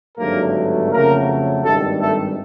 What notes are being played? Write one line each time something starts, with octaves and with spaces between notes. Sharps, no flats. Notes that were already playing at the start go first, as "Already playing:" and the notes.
G#1 G2 D3 F#3 A3 A#3 A#4
F2 C#3 F#3 A3 A#3 A#4
G#1 G2 D#3 G3 A3 A4
A3 A4